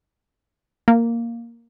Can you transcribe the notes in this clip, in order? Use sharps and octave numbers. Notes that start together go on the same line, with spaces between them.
A#3